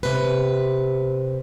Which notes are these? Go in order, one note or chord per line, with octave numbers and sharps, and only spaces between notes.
C3 B4